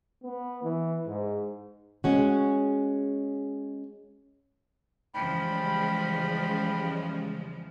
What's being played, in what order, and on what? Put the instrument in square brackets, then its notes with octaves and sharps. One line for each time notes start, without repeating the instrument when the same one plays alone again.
[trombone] B3
E3
G#2
[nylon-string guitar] G#3 C#4 F#4
[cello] E2 F3 [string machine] C#3 G3 G#3 [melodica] G5 B5